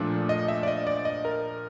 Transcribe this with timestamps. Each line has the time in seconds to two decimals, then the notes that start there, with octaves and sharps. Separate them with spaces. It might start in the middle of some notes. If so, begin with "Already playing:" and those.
Already playing: A#2 F3 A3 D4
0.29 D#5
0.48 E5
0.63 D5
0.68 D#5
0.87 D5
1.05 D#5
1.25 A#4